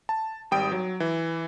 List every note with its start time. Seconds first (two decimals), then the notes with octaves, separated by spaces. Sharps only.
0.09 A5
0.51 G#1 G3 G5 D#6 D7
0.72 F#3
1.00 E3